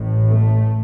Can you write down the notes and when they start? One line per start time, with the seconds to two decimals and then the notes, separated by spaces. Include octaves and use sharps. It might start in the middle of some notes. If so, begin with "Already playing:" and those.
Already playing: A1 A2
0.25 A3